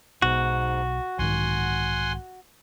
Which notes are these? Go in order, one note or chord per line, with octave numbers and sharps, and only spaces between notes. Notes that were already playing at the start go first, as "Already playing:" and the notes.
B1 G#2 B2 F#4
B1 G#2 D#3 F#5 G#5 C6